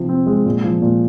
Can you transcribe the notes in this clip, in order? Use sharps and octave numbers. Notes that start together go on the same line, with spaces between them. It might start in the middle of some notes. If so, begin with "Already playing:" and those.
Already playing: C3 F3
C4
G#3
A#2
F3
A#2